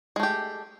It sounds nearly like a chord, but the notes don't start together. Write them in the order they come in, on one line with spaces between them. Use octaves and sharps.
G#3 A3 G4